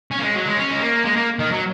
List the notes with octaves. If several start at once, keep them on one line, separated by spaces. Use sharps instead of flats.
C#4
A#3
G#3
F#3
G#3
C#4
G#3
A#3
G#3
A#3
D#3
F#3